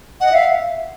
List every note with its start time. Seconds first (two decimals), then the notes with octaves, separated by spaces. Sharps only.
0.20 D#5 F#5
0.31 E5 F5